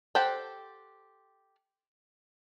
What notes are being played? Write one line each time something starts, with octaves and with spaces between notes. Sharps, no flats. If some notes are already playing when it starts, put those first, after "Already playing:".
G4 A4 C5 F#5 G5